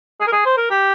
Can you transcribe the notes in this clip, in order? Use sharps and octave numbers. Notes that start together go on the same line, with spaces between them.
G#4
A#4
G#4
C5
A#4
G4